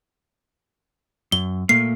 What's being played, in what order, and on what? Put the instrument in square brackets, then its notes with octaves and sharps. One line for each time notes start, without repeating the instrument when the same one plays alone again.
[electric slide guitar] F#2 [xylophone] G7
[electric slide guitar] A#2 A3 A#3 [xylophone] C7